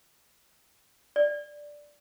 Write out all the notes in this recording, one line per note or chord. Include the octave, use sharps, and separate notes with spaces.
D5